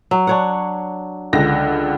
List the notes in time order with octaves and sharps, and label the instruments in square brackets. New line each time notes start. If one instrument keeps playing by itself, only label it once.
[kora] F#3
D4 C#5 F#5
[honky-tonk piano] C#2 D3 A#6